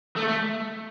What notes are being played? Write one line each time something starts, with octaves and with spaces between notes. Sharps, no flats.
A3
A3